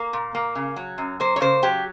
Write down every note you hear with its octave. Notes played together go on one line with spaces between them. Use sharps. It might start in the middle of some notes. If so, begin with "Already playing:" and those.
Already playing: A#3
A#2
A#3
C#3
F#3
F#2
A#3 C5
C#5
C#3 C5
F#3 G4